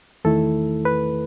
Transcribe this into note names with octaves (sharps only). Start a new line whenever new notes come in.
E2 D#3 A3 E4 A4
B4